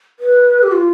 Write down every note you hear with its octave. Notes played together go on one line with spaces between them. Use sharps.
B4
G4
F4